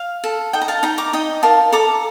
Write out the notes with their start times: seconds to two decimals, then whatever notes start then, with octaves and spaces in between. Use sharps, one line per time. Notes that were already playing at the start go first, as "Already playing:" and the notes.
Already playing: F5
0.24 A4
0.53 D#4 D#5 G5
0.61 A#5
0.68 F5 A5
0.83 D#4 G5 A#5
0.98 A#5 D6
1.13 D#4 D#5 G5
1.43 A#4 F5 A5
1.72 A4 A#5 D6